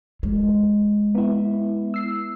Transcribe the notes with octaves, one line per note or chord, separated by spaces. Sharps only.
G#3
B3 E4
E6 C7